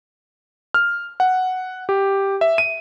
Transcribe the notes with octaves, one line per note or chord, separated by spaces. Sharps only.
F6
F#5
G4
E5
D#7